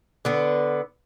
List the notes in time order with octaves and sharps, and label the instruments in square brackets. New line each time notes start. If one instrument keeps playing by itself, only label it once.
[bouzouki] D3 B3